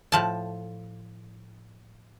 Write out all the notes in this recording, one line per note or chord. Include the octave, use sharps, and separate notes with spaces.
A2 F3 A5